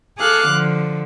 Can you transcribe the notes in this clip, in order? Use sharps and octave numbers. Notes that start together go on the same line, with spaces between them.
G#4 A4 F5 D6 F#6
D3 F3